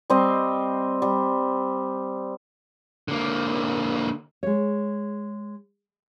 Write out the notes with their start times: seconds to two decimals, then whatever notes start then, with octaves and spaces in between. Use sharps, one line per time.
0.10 G3 C4 D#5
1.02 G3
3.08 D3 A#3
4.43 G#3 C#5